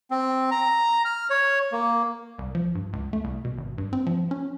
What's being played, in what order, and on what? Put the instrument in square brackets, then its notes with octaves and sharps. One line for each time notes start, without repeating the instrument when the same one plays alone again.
[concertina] C4
A#5
F6
C#5
A#3
[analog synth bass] C2
F3
G2
C#2
A3
C2
B2
G#1
G2
C4
F3
C#4